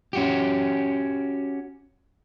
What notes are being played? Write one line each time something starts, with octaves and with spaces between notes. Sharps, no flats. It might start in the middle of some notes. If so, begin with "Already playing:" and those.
C#4 F#4 G4